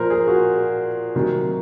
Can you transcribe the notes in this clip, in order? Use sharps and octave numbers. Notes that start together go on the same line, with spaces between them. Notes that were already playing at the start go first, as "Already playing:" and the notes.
Already playing: A#2 F3 A#4 C5
G#4
F#4
C3 D#3 F#3